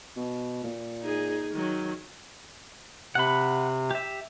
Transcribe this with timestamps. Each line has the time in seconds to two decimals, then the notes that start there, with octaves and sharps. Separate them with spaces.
0.16 B2
0.64 A#2
1.01 D#4 G#4
1.53 D#3 F#3
3.15 C3 F#5 B5
3.91 G4 E5